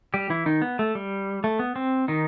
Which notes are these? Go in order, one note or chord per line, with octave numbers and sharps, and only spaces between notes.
G3 G4
E3 E4
D#3 D#4
B3
A3
G3
A3
B3
C4
D#3 D#4